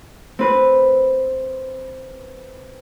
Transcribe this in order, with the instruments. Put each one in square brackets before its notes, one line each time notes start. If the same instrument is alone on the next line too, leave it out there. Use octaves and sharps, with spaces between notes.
[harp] C4 B4